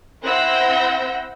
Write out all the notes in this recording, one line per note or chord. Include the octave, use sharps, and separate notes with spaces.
C4 E4 F#5 E6 G6 A#6